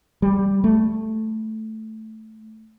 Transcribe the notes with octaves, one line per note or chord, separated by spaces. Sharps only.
G3
A3